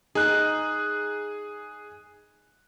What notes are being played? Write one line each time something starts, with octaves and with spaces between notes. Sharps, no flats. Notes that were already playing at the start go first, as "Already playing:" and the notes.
D#4 G#4 F#6